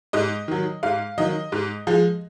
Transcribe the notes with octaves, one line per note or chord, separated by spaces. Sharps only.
G#2 D#5
D#3 F#3
G#2 F5
D#3 F#3 D#5
G#2
F3 G#3